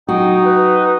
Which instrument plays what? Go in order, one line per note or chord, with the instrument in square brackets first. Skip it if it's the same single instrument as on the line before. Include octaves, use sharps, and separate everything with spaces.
[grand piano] F#3 [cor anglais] D#4 [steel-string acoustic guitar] F#4 [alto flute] G5
[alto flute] B4